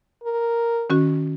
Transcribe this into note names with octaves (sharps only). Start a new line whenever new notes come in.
A#4
D#3 C#4 F#4